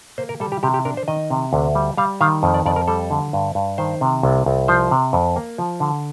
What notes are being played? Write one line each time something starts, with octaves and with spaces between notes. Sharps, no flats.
A#3 C5
A#4
G3 A4
G4
C3 G4
G4
D4 A#4
C5
D#3 D#5
C3
D2
G3
G3 F5
D#3 F5
F2
D5
F2 D5
A#4
G3 A4
D3
G2
G2
D#3 C5
C3
C2
C2
F3 C5
C3
F2
A#3
F3
D3